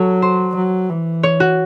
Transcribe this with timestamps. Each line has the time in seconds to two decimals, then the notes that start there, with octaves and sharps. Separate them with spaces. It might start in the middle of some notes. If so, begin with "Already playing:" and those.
Already playing: F#3 A4 C#5
0.22 C5
0.56 F#3
0.90 E3
1.23 C#5
1.40 F#4